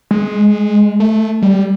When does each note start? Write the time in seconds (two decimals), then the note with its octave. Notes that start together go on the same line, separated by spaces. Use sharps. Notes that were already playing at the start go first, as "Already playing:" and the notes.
0.11 G#3
1.00 A3
1.42 G3